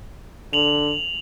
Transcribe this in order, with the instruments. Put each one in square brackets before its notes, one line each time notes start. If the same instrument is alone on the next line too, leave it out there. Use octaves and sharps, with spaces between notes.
[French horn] D3 [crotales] F7 F#7